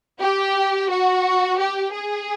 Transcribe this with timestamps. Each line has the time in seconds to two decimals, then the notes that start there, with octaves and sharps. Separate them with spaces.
0.21 G4
0.90 F#4
1.58 G4
1.92 G#4